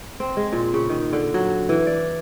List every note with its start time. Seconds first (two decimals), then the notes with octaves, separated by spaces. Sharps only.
0.20 C4
0.37 G#3
0.53 A#2
0.74 C#3
0.89 D#3
1.13 D3
1.34 F#3
1.69 E3
1.87 D5